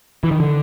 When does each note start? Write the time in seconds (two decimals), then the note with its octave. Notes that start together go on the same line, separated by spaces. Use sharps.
0.24 E3
0.31 D#3
0.40 D3